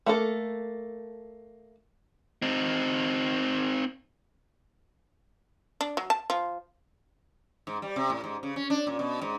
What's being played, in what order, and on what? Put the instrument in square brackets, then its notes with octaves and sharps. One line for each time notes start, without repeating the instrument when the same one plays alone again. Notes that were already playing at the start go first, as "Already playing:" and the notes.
[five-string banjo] A3 A#3 A4
[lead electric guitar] C4 D#4
[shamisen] D4
F#3
A5
F3
[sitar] G#2
G3
C3
A2
G#2
C#3
C#4
D4
A#2
B2
G#2